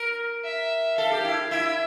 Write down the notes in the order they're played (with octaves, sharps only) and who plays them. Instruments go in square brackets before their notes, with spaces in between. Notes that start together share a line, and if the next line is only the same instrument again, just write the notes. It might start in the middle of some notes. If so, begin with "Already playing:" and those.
Already playing: [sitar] A#4
[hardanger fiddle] E5
[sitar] A4 [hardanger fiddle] F5
[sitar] G4
E4
[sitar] E4 [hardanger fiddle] E5